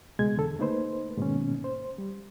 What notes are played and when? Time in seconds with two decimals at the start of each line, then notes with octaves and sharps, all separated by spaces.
0.19 C#2 B2 G#3 G#6
0.36 E2 D3 A4
0.59 A3 A#3 D#4 B4 C5
1.17 G#2 B2 D#3 A#3 C#4
1.64 C5
1.98 G3